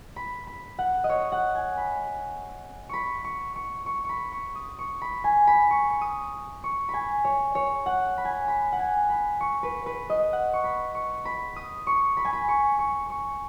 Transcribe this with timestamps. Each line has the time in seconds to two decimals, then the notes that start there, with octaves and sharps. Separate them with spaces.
0.16 B5
0.47 B5
0.79 F#5
1.04 D#5
1.09 C#5
1.32 F#5
1.55 G#5
1.78 B5
2.89 B5 C#6
3.24 C#6
3.56 C#6
3.86 C#6
4.05 B5 C#6
4.32 C#6
4.55 D#6
4.79 C#6
5.02 B5
5.24 G#5
5.47 B5
5.71 C#6
5.90 C#6
6.01 D#6
6.64 C#6
6.89 G#5 B5
7.25 C#5
7.55 C#5
7.86 F#5
8.18 B5
8.25 G#5
8.33 B5
8.48 B5
8.72 F#5
8.79 G#5
9.10 B5
9.40 C#6
9.63 B4
9.86 B4
10.10 D#5
10.33 F#5
10.53 C#6
10.64 B5
10.95 C#6
11.25 B5
11.56 D#6
11.87 C#6
12.17 B5
12.25 G#5
12.33 B5
12.48 C#6
12.79 C#6
13.10 C#6